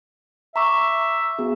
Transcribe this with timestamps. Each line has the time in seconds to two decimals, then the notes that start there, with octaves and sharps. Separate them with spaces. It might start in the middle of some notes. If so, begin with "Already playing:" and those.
0.56 E5 A#5 C#6 D6
1.39 B3 F#4 G#4